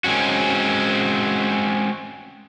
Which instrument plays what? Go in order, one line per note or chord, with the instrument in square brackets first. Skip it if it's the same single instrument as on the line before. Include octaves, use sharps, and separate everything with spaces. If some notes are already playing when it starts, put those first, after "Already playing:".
[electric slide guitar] G#3 C4 C#4 F#4